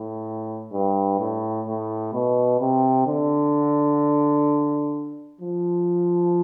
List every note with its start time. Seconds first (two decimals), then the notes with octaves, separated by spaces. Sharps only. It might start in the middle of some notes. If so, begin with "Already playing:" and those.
Already playing: A2
0.73 G2
1.19 A2
1.67 A2
2.13 B2
2.60 C3
3.07 D3
5.41 F3